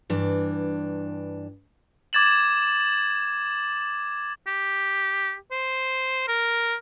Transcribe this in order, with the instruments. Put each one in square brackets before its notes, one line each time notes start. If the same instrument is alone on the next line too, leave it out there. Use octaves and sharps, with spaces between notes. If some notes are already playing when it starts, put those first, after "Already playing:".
[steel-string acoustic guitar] G2 E3 D4
[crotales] D6 G#6 A6 E7 F#7
[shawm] G4
C5
A#4